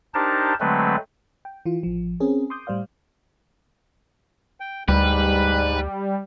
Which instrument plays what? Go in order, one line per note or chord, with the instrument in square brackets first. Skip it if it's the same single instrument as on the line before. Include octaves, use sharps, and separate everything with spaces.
[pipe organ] D4 D#4 G4 A#4 C5 A5
D3 F#3 G#3 A3 C4 B4
[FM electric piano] G5
E3 F4
A1 F3
C4 C#4 G#4 A#4
C6 D6 D#6 G6
A2 G3 C5 D5 F5
[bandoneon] G5
[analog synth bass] D2 [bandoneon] G#2 F#6 [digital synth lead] G3 [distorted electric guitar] B4